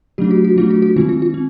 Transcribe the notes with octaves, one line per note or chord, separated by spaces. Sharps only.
F#3 A3 D4 G4
F#4
F#4
F#3 A3 D4 F4
F#4
F#4
D#3 G#3 C4 F4
F4
F4
C4